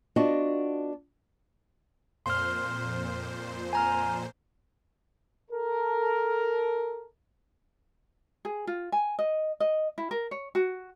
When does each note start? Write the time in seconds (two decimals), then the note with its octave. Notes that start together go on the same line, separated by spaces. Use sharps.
0.16 B3 D4 F4 F#4 D#5
2.26 F2 A#2 C5 C6 F6
3.73 G#5 A#5 F6
5.51 A4 A#4
8.45 G#4
8.67 F4
8.92 G#5
9.19 D#5
9.60 D#5
9.98 E4
10.11 A#4
10.31 C#5
10.55 F#4